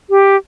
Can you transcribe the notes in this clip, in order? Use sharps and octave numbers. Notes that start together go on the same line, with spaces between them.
G4